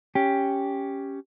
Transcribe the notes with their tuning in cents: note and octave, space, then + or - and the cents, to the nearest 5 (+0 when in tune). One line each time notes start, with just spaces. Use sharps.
C#4 +0 G4 +0